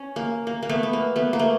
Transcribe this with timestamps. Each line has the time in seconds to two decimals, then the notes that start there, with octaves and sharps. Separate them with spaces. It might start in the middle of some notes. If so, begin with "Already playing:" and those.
Already playing: C#4
0.16 A#3
0.47 A#3
0.63 A#3
0.69 A3 B3
0.83 B3
0.93 A#3
1.16 A3 B3
1.33 A#3
1.39 A3